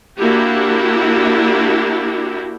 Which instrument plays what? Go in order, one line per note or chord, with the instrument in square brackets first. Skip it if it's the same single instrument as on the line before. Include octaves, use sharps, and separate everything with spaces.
[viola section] A#3 D4 E4 F#4 G4